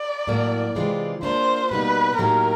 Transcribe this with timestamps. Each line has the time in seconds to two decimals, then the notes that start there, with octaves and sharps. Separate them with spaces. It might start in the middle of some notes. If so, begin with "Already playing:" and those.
Already playing: D5
0.27 A2 F#3 A#3
0.75 C3 E3 G#3 C4 F4
1.23 A#3 D4 F4 C5
1.71 B2 G3 A#3 D#4 B4
2.18 A2 F#3 A#3 D#4 G4 A#4